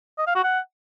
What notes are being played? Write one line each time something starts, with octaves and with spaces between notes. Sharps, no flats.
D#5
F5
F#4
F#5